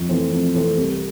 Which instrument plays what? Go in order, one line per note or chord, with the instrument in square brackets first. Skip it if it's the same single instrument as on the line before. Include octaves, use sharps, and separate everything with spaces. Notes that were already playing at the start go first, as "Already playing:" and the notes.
Already playing: [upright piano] F2
E3 A3 C4
F2
E3 A3 C4
C2